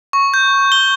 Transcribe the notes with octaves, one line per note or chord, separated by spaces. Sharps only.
C#6
G6
G7